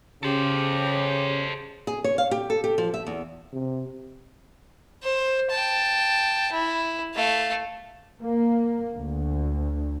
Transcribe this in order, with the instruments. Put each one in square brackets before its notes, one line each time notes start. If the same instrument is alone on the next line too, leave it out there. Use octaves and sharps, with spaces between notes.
[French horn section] C#3 [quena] G4 [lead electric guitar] A4 C5
[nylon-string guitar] G#4
C#5
F5
G4
A4
G4
F3
E5
E2
[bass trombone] C3
[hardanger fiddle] C5
G5 A5
E4
A3 F5
[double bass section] A#3
D2